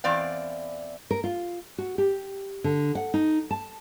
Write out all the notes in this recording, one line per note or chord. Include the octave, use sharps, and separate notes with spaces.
E2 C4 D5 F5
A#4
F4
F#4
G4
D3
F#5
D#4
A5